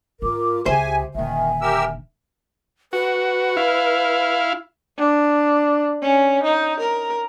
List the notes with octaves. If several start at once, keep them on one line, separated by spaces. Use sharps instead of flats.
G#2 F4 A#4 D6
C#2 G4 G#4 C5 E5 G#5
D#1 D3 D#3 E5 G#5
G4 A#4 E6
F#4 B4
E4 F5
D4
C#4
D#4
A#4